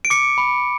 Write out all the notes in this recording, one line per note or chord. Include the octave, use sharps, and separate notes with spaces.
D7
D6 C#7
B5